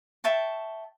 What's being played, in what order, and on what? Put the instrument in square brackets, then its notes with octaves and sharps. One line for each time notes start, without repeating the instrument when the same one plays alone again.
[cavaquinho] E5 G5 A5 C#6